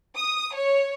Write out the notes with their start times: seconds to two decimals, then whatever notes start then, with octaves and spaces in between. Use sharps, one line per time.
0.16 D#6
0.55 C#5